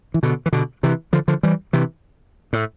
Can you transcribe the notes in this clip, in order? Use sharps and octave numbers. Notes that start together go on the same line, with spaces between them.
E3
B2 D3
E3
B2 D3
C3 E3
D3 F3
D3 F3
E3 G3
C3 E3
A2